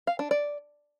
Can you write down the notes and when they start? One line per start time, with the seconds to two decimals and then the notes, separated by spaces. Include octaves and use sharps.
0.07 F5
0.19 D4
0.31 D5